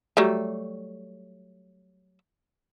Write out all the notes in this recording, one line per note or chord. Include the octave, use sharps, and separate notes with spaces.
F#3 G3 A3